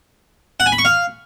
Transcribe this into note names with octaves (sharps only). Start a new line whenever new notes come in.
F#5
G#5
B5
C#6
F5